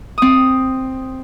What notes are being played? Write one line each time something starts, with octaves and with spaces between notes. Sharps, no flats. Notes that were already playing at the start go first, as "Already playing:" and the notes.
C4 D#6